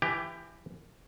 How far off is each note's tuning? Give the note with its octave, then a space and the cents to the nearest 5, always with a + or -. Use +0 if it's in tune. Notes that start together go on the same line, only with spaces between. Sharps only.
E3 +20 G4 +20 G5 +0